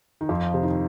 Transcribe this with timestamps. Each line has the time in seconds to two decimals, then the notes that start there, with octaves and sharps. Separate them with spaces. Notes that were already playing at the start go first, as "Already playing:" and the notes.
0.21 D#3
0.29 F2 F3
0.54 C3
0.63 D#3